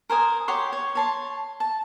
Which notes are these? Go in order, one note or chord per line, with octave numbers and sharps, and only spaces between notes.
A#4 C5 G#5 D#6
G4 C#5 F#5 C6
C#5
C#5 A5 C6
A5